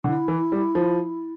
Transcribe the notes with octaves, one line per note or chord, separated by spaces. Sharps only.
D3 E4
E3
G3
F3